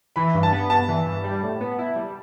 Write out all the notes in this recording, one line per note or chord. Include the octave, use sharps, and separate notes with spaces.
E3 B5
G2
A5
B3
G2 A5
E3
G2
G3
A2
B3
E4
G3